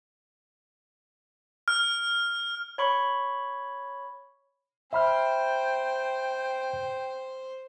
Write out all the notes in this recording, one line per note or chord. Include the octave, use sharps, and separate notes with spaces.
F6
C#5 B5 C#6
C5 E5 G5 B5 F6